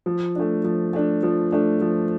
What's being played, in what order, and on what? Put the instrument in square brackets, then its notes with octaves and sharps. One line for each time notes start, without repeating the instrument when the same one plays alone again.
[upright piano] F3
A3 D4
F3
A3 D4
F3
A3 D4
F3